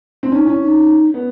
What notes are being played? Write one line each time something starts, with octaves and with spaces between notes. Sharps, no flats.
C4
C#4 D#4
C#4 E4
D#4
B3